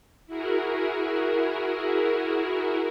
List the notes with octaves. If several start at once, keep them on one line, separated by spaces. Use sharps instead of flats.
E4 F#4 G#4 A#4